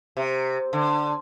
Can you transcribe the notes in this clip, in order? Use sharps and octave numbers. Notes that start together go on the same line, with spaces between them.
C3
D3